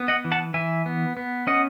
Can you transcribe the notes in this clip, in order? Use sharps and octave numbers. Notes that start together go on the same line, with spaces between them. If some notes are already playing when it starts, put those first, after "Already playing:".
Already playing: B3
D#5 F#5
E3
F#5 A5
E3 E5 G#5
B3
B3
C#4 D#5 F#5